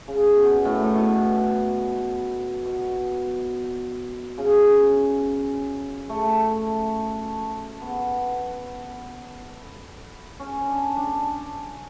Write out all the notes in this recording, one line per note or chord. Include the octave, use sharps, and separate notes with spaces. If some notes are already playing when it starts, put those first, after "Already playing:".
C#3
B2
A2
A2
B2
B2
C#3
A3
B3
C#4
D4
D4